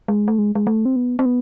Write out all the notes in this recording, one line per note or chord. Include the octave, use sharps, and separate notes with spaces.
G#3
A3
G#3
G#3
A3
C4
B3
C4
B3